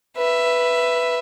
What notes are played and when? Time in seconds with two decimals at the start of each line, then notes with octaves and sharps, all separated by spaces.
0.17 B4 E5